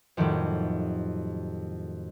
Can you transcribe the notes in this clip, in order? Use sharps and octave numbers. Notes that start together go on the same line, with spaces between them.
F2 A2 D#3 F#3 G3